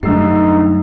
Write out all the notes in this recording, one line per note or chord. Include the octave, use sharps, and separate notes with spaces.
F#2 D3 G3 A3 D#4 E6 C7